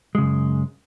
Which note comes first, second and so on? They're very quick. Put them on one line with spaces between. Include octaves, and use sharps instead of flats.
G#3 C#3 F#2